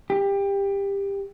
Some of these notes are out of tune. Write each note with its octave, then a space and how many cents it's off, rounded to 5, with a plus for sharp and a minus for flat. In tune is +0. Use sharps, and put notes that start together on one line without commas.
G4 +20